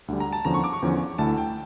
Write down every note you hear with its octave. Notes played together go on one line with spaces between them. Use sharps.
D2 D3 G3
A#5
A5
E2 D3 F3 C#4 A#5
C#6
D6
C#6
E2 D3 F3 C#4
D2 D3 A3 E4 A5
G5